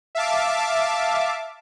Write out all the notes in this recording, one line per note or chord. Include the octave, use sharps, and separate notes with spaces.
E5 F5 A5 D6